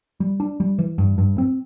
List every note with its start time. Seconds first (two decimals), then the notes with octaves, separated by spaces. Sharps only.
0.20 G3
0.40 D4
0.60 G3
0.79 E3
0.98 G2
1.18 G2
1.38 C4